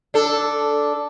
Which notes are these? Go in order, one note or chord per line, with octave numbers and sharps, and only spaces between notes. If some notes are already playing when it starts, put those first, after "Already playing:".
D4 A4